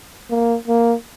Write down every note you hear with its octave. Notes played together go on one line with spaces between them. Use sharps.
A#3
A#3